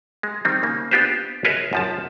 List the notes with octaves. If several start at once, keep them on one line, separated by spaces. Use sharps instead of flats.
G#3
D#3 G3 C4
C#3 A#3
B3 D4 F4 G4 B4 C5
G#4 A#4 B4 C#5 D#5 E5
F#2 F3 A5